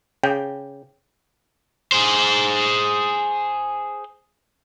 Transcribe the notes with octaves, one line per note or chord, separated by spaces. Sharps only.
C#3 G5
G#4 C5